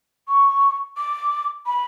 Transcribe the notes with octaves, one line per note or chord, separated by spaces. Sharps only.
C#6
D6
B5